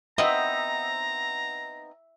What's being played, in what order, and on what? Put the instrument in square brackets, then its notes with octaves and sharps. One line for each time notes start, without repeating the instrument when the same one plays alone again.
[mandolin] B3 C4 D#4 [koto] D#5 [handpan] E5 [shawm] A#5